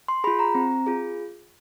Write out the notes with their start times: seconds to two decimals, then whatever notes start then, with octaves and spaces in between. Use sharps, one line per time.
0.08 C6
0.24 F4 G#4 B5
0.39 A#5
0.55 C4
0.87 F4 G#4